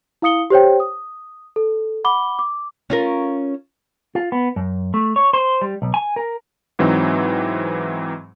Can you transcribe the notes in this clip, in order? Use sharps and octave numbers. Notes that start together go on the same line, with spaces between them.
E4 F5 D#6 C#7 G7
G4 C5 C#5 G5
D#6
A4
F#5 B5 D6 G7
D6
C#4 F4 A#4
F4
B3
F#2
A3
C#5
C5
G3
B1
G#5
A#4
G#2 E3 F#3 C4 D#4